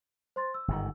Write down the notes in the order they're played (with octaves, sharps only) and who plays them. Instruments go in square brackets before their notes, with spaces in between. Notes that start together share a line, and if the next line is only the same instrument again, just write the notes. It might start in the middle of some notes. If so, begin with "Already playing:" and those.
[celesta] C5 C6 A6
E6
[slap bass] G1 G#2 D#3